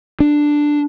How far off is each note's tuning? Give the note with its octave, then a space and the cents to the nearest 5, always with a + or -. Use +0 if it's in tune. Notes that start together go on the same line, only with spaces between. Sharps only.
D4 +5